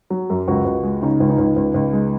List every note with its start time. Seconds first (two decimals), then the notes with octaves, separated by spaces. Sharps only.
0.10 F#3
0.30 F#2
0.48 C#2 F#4
0.65 C#2
0.83 G#3
1.02 C#3 D#4
1.20 C#2
1.30 D#4
1.38 C#2
1.56 C#2
1.74 C#2
1.93 G#3